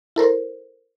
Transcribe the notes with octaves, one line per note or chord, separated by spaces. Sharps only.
E4 A4 A#4 C5